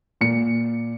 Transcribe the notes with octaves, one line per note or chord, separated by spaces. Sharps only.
A#2 C#7